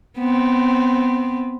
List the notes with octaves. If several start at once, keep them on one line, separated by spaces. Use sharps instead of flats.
B3 C4